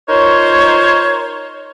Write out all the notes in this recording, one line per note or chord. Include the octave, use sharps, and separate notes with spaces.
D#4 F4 A#4 C5 C#5